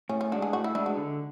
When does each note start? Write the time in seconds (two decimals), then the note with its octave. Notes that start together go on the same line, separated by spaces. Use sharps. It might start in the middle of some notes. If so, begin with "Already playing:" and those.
0.09 A2 C#4
0.21 C#4
0.32 G#3 D4 F#4
0.42 G#4
0.53 A2 F#4
0.64 E4
0.75 G#3 D4 E4
0.86 F#4
0.97 D3